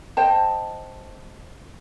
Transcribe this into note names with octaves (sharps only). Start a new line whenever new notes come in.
C5 D#5 G5 A5